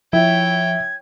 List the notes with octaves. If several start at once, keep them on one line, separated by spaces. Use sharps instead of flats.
F3 E4 C#5 G5 G#6